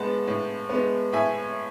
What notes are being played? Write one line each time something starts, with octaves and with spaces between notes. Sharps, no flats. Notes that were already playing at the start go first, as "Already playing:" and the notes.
Already playing: A2 G#3 B3 F#5 A5 B5
A2
G#3 B3
A2 E5 G#5